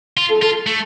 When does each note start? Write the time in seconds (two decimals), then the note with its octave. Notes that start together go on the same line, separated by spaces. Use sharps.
0.17 F4
0.29 A4
0.42 F4
0.67 A3